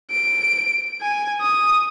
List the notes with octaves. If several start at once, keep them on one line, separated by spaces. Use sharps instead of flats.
D7
G#5
D#6